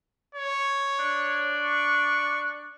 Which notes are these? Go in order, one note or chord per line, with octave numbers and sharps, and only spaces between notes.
C#5
D4
C#6